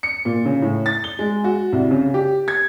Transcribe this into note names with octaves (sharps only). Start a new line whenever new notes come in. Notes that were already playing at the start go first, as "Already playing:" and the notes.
C#7
A#2
C#3
A2
A6
G7
G#3
F#4
C2
C#3
G4
G#6